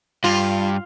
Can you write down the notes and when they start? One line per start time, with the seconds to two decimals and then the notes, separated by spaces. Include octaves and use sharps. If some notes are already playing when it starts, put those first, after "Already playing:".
0.24 G2 F4